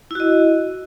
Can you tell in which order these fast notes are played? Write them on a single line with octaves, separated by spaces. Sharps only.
E4 F#4 D#5